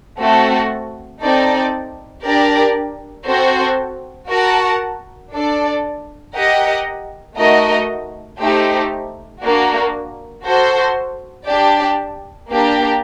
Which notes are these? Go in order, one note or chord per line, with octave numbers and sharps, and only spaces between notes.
A3 C4 F#4 A4
C4 D#4 A4 D5
D4 G4 A#4 D5
C4 F#4 A4 C5
F#4 A#4 F#5 A5
D4 A4 D5
G4 A#4 D#5 F#5
A3 D#4 F#4 A#4 D#5
A3 D#4 G4 C5
A#3 D4 F#4
F#4 A4 C5
D4 G4 D5 A5
A#3 D4 G4 A#4